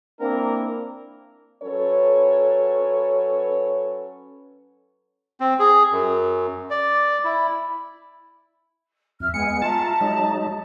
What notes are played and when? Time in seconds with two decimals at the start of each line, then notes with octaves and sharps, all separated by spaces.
0.21 A#3 C4 D4 E4 A#4
1.63 F#3 C#4 A4 B4 C#5
5.40 C4
5.59 G#4
5.92 F#2
6.70 D5
7.24 E4
9.20 F2 E5 F6
9.34 G#3 B3 G#5 C#7
9.62 F4 E5 A5 A#5
10.01 F#3 G#3 D#4